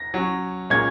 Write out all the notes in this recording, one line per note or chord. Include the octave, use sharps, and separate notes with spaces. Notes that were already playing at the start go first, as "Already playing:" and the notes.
Already playing: A#6
F#3 C#4
A#2 G#3 C#4 G#6